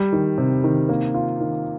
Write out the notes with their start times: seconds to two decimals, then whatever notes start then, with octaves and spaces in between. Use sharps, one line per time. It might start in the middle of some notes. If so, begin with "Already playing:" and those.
Already playing: G3
0.13 D#3
0.38 C3
0.64 D#3
0.89 A#3
1.14 F4
1.41 D#3